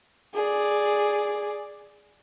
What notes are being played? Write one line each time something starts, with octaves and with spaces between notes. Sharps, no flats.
G#4 D5